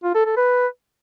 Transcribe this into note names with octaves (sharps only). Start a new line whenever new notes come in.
F4
A4
A4
B4